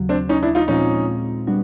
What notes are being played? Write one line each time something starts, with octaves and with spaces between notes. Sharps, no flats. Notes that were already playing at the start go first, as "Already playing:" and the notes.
Already playing: D#2 C#3 F#3
C4 D4
C#4 D#4
D4 E4
D#4 F4
A#2 F3 G#3 C4 C#4 D#4 F4
G3 B3 D4 F#4